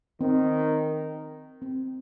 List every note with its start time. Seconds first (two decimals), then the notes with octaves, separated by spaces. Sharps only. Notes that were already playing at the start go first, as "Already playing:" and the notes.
0.21 D#3 C4
1.62 C4